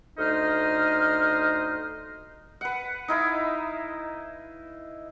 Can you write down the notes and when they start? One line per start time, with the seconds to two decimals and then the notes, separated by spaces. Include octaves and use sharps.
0.18 D2 D#4 C5 D#5 F6
2.61 B4 F#5
3.08 D#4 E4 F5